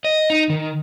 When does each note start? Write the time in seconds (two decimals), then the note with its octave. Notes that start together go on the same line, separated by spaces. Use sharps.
0.04 D#5
0.30 D#4
0.50 D#3